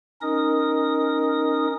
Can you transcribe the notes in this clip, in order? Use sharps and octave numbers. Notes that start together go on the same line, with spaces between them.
C#4 D#4 A#4 D#5 D#6